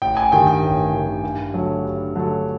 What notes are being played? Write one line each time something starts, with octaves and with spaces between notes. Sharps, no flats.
A1 G5
G#5
G2 D#3 G5
G5
A1
G2 D#3
G2
D3 F#3 A3
G2
D3 F#3 A3